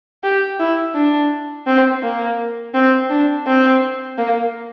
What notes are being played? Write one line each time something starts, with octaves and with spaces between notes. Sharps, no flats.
G4
E4
D4
C4
A#3
C4
D4
C4
A#3